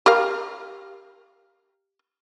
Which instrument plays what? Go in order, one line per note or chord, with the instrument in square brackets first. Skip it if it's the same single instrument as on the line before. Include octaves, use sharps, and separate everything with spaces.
[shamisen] G4 A#4 F5